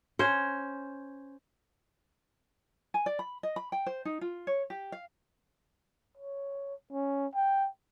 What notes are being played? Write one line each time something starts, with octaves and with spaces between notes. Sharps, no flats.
C#4 C5
G#5
D5
B5
D#5
B5
G5
C5
D#4
F4
C#5
G4
F5
C#5
C#4
G5